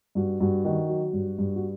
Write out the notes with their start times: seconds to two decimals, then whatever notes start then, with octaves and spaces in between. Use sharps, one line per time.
0.15 G2 F#4
0.40 G2 F#4
0.65 D#3 F#4
0.89 F#3
1.13 G2
1.38 G2
1.56 F#4